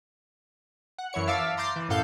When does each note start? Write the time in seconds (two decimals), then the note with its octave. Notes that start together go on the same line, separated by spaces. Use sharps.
0.98 F#5
1.13 F#2 E3 E4 C#5 C#7
1.27 E5 F5 A5 D6 E6
1.57 A#5 C6 D6 G6 A6 C7
1.76 E3
1.89 F#2 A2 A4 F5 G6